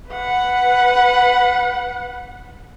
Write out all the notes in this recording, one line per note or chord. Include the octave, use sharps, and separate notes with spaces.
B4 F#5